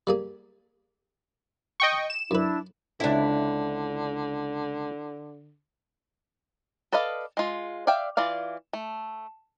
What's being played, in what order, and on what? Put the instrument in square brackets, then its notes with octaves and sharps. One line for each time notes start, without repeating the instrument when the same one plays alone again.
[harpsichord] G3 A#3 G#4
[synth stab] D#5 G5 C#6
E7
[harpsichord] F#2 B4 [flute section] D4 E4
[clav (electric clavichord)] C#2 C4 [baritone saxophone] D3 [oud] D4 E4
[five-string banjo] A4 B4 D5 D#5 F5
G#3 F4
D5 E5 F5 G5
E3 F4 D5 F5
A3